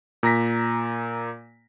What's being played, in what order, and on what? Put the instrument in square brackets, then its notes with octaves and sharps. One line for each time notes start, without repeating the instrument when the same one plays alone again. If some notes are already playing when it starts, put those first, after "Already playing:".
[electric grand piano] A#2 A#5 A#6 B6